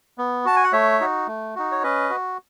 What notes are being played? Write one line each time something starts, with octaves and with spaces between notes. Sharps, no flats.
B3
F#4 A5
G#5
F#5
A3 C#5 E5
D#4 F#4
A3
D#4 F#4
C#5
C#4 B4 D#5
F#4